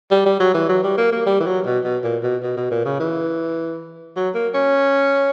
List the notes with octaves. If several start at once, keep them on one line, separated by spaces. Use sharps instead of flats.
G3
G3
F#3
E3
F#3
G3
A#3
A#3
G3
E3
F#3
B2
B2
A#2
B2
B2
B2
A#2
C#3
E3
F#3
A#3
C#4